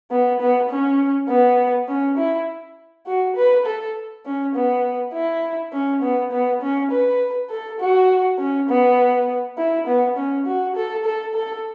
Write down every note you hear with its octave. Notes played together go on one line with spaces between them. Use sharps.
B3
B3
C#4
B3
C#4
E4
F#4
B4
A4
C#4
B3
E4
C#4
B3
B3
C#4
B4
A4
F#4
C#4
B3
E4
B3
C#4
F#4
A4
A4
A4